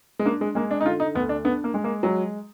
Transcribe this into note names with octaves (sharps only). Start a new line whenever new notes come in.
G#3
A#3 D4
G#3
G#3 A#3
D4
D#4
D3 F4
D#4
D2 B3
D4
B3 D4
A#3
G#3
A#3
F#3 G#3